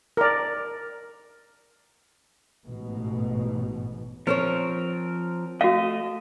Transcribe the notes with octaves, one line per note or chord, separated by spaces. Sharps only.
A#4 D5
A1 G#2 B2
F3 C4 A#4 C5 C#5
A3 F#4 D#5 F5